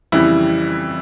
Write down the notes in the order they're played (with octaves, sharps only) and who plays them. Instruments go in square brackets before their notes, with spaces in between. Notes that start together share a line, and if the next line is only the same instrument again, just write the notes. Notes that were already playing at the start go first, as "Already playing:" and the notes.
[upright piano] F2 C#3 E3 G3 E4